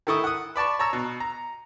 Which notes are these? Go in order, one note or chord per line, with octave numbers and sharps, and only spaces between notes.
D#3 A3 E4 A4 C#6 D#6
F#5 D#6
B4 D5 A5 C#6
C#5 A5 A#5 E6
B2
A#5